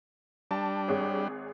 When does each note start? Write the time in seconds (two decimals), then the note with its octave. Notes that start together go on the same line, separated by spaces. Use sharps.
0.51 G3 D4 A5
0.88 G#1 G#4 C#5